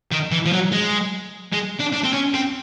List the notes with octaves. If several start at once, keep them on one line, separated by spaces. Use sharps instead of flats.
D#3
E3
F3
F#3
G#3
G#3
D4
D4
C4
C#4
C4